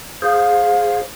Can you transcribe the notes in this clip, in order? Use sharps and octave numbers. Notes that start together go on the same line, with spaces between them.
G#4 C5 F5